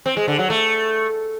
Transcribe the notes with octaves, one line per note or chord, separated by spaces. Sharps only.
C4
G#3
D3
F#3
A3